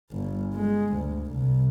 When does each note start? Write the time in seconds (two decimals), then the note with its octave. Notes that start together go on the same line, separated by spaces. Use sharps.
0.12 G1
0.54 G#3
0.94 D2
1.31 C2